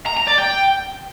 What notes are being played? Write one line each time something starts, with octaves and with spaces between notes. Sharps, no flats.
A#5
A#5
D5
G5